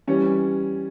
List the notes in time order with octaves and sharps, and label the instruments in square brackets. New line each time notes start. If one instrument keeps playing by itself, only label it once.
[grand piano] E3 G3 C#4